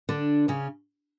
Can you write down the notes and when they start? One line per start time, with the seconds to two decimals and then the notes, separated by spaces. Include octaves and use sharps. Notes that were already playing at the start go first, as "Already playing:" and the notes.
0.09 D3 D4
0.48 C#3 C#4